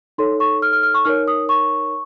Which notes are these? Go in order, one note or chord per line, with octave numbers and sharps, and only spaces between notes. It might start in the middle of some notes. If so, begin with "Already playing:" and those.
D#4 A4 C#5 C6
C#6
F6
F6
F6
C#6
D#4 A#4 C#5 F6
D#6
C#6